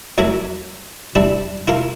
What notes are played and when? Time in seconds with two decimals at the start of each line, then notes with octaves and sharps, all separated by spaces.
0.18 F2 F#3 E4 A#4 B5
1.15 G3 C4 D4 E4
1.67 E4 F4 A#4 C6